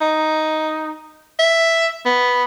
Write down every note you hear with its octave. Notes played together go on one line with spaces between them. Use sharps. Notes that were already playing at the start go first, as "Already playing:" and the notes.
D#4
E5
B3